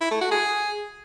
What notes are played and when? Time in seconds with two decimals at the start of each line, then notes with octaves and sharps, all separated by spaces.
0.01 E4
0.11 A3
0.21 F#4
0.31 G#4